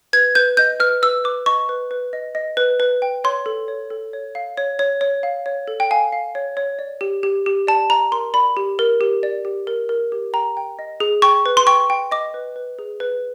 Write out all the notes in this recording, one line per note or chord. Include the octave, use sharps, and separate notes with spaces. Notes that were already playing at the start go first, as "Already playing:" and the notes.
B4 G#6
B4 G6
D#5 G6
B4 F6
B4 E6
B4 D6
D#5 C#6
B4
B4
D#5
D#5
B4
B4
G5
C#5 C6
A4
C#5
A4
C#5
F5
C#5
C#5
C#5
F5
C#5
A4
G5
F5 G#5
F5
C#5
C#5
D5
G4
G4
G4
D5 A5
D5 A#5
A#4 C6
D5 B5
G4
A#4
G4
D5
G4
A#4
A#4
G4
G5 A#5
G5
D#5
G#4
G5 C#6
B4
C6
G5 C#6
G5
D#5 D6
B4
B4
G#4
B4